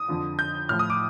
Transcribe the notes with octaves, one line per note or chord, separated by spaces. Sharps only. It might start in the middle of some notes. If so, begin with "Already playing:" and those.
Already playing: D#6
F2 D3 F3
G6
A2 F3 F6
D#6
D6